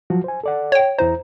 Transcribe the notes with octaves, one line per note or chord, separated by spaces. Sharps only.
F3 F#3 F#4
C5 G#5
A4 D5 F#5
C#5 G5
E2 E4 C5 A#5